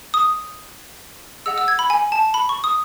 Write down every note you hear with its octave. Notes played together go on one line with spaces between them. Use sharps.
D#6
G#4 D#5 F#5 E6
E6
G#6
B5
G#5
A5
B5
C#6
D#6